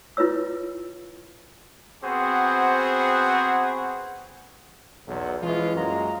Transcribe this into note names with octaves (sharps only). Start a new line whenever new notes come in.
E4 F4 B4 C#5 E6
B3 C4 F#4 G#4 C5 F#5
B1 E2 F#3
E3 F3 G#3 C#4 E4 F4
F#2 A#2 G#3 A#3 F5 A#5